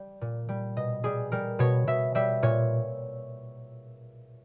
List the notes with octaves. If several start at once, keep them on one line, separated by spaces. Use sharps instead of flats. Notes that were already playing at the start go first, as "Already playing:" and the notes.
Already playing: G3
A#2
G3
B2 D#5
G3 G#4
G3 A#4
B2 C#5
B2 E5
G3 E5
A#2 C#5